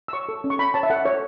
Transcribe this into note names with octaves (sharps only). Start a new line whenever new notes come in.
E6
C#5 C#6
A4
C#4
C#6
C#4 B5
C#5 A5
E5
A4 F#5
A4 C#5